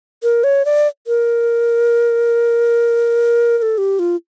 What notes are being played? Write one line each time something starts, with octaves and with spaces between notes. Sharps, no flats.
A#4
C#5
D5
A#4
A#4
A4
G4
F4